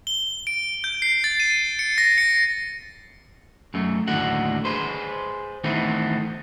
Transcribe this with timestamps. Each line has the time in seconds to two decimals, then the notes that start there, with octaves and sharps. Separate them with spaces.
0.07 G7
0.47 D7
0.84 G6
1.02 C7
1.24 A6
1.40 D#7
1.79 C#7
1.98 A#6
2.18 C#7
3.74 F#2 A3
4.08 D#2 A2 D3 F#4 F#5
4.65 G#4 B4 C5
5.64 D#3 E3 A3 B3 C4